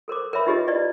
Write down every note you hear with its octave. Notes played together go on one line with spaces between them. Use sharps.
A4 A#4 C5 D6
A#4 B4 C#5 E5 B5
D#4 F4 G4 G#4 B4 D#5
E4 B4 D5 D#5